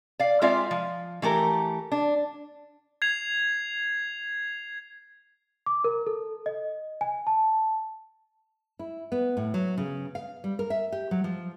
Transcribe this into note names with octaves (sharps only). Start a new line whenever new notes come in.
D5 F5
G#3 C4 F4 D5 E5
F3
E3 A3 G4 A#4
D4
G#6 C7 F7
D6
A#4
A4
D#5
G#5
A5
E4
B3
A2
F#3
C#3
F5
G3
A#4
E5
G4
F#3
F3